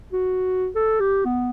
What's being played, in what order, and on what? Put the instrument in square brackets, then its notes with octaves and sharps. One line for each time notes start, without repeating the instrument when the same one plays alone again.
[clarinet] F#4
A4
G4
B3